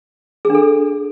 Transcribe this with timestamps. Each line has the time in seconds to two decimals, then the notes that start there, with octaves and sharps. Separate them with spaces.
0.45 G#4
0.50 D4
0.55 A4